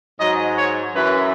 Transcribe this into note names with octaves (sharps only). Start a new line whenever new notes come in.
G#2 F#3 D#5
C#5
F#2 E3 B4